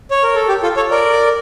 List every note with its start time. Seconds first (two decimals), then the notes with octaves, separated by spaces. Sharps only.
0.11 C#5
0.23 A#4
0.35 A4
0.48 G4
0.62 F4 A4
0.76 A4 C#5
0.91 A#4 D5